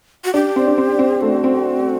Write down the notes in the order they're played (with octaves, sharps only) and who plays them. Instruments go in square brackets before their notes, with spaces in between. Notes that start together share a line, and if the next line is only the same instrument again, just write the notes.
[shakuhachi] F#4
[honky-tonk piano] D4 [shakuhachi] G4
[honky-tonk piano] C4
D4
C4
C4
[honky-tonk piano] A3 [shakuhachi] F#4
[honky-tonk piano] C4